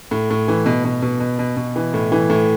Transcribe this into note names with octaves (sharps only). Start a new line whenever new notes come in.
A2
A2
E3
B2
B2
B2
B2
B2
B2
E3
A2
E3
A2